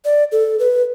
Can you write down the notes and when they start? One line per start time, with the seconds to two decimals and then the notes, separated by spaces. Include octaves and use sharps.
0.05 D5
0.32 A4
0.59 B4